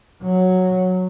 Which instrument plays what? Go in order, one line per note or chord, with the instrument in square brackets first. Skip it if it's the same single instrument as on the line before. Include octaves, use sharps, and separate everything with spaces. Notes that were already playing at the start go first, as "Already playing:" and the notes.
[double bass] F#3